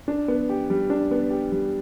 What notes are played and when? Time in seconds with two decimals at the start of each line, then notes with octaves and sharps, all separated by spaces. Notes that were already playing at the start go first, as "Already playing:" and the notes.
0.08 D4
0.28 B3
0.49 G4
0.70 G3
0.90 D4
1.11 B3
1.30 G4
1.52 G3